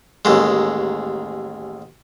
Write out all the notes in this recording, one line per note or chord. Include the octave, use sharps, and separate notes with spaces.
A1 D#2 G#3